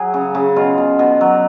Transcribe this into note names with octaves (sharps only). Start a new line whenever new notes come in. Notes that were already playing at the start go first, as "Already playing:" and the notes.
Already playing: F#3 G#4
C#3
C#3
B2 F4
B2
B2
F#3